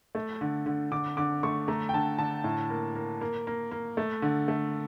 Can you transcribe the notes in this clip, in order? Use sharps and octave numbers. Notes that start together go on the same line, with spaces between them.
A3
D3
D3
D3 D6
D3 D6
A3 C#6
A3 A#5
G5
D3 A5
D3 A5
A2
A#3
A#3
A#3
A#3
A#3
A3
D3
A3